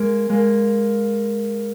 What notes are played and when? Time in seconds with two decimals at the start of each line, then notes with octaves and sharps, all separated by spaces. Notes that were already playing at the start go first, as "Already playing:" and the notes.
Already playing: G#3 A#3
0.30 G#3 A#3